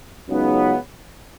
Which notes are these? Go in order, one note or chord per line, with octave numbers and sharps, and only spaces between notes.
C#2 C#3 F#3 B3 D#4